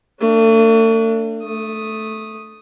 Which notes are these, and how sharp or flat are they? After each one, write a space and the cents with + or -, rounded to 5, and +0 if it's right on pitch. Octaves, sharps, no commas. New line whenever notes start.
A3 +40 D4 +0
A3 -5 D#6 +0